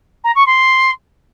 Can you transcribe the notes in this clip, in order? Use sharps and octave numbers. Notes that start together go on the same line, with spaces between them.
A#5
C#6
C6